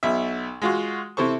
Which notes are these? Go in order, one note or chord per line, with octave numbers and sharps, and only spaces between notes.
B1 B2 E5
G#3 F4 F#4
C3 E4 A4 C5 C#6